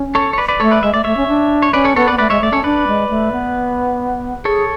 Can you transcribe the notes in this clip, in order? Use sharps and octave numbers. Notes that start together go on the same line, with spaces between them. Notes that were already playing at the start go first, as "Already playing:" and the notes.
Already playing: C#4
A4 C#5
C#5
B4 D5
B4 D5
A3 A4 C#5
B4 D5
G#3 E5
A3 D5
A3 C#5 E5
C#4
D4
C#5
C#4 B4 D5
A4 C#5
B3 A4 C#5
B4 D5
B3
A3 B4 D5
G#3 C#5 E5
A3 D5
C#4 A4 C#5
D4 B4 D5
G#3
A3
B3
G#4 A4 C#5